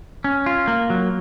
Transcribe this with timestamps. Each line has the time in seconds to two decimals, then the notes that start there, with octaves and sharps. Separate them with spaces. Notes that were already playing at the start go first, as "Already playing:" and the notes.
0.24 C#4
0.46 F4
0.68 A#3
0.90 F#3